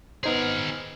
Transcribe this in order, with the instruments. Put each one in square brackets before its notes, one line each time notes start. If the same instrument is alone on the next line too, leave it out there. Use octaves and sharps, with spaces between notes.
[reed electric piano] B3 D#4 C5 [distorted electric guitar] G#4 A#4